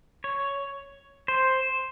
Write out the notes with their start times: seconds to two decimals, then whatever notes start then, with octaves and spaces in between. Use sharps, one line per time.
0.24 C#5
1.28 C5